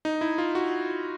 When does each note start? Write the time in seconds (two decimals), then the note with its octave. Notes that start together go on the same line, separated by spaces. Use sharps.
0.05 D#4
0.21 E4
0.38 F4
0.55 F#4